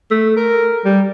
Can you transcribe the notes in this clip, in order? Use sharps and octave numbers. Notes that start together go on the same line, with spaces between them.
A3
A#4
G3